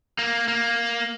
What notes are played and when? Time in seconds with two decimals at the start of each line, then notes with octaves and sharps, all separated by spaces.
0.19 A#3
0.48 A#3